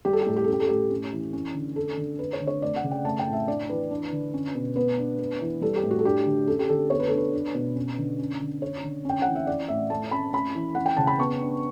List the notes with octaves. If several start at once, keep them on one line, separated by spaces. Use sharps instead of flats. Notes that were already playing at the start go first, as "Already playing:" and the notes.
G3 G4
A4
G4
A2 A4
G4
A4
C#4 G4
A4
A2 G4
C#4
E3
C#4
D3
C#4 A4
D3
D4 B4
C#5
D3
C#5
A3 D5
F#5
C#3
G5
A3 A5
G5
A2
E5
D4 D5
E3 B4
D4
D3
C#4
B2
B3 B4
D4
B3
E3
G3 A4
G4
A2
F#4
A4
D4 G4
D3
C#4 A4
G4
D3 A4
B3 C#5
B4
A4
D4 B4
D4
B2
C#4
D3
C#4
D3
C#4 C#5
D3
C#4 G5
E3 F#5
E5
C#4 D5
A2 E5
A3 A5
C#4 B5
C#4 B5
E3
C#4 F#5
G5
C#3 A5
B5
B3 C#6
D4